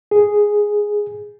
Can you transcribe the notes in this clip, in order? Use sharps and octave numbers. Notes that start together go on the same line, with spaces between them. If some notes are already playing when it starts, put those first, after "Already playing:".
G#4